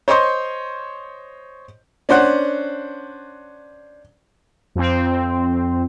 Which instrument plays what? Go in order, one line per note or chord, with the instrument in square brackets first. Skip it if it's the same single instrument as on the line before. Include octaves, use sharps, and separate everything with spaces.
[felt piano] C5 C#5 D#5 C6 C#6 G6
[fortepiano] C#4 D4 C5 F#5
[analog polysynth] F2 C4